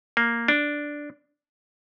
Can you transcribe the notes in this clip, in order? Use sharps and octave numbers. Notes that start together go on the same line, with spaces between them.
A#3
D4